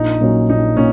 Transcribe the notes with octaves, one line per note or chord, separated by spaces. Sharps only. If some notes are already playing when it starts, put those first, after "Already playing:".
Already playing: A#1 D#4
A#2 F#3 C#4
A#1 D#4
A#2 C#4